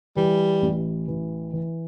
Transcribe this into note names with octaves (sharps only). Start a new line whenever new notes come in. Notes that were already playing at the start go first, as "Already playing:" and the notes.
E3 G3
A1
E3
E3